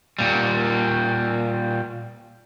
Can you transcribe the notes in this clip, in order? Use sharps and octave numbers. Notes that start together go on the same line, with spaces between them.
A#2 G3